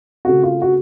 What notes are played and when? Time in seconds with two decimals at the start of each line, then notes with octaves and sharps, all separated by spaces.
0.25 C#3 A3 C4 F#4
0.43 F4
0.62 F#4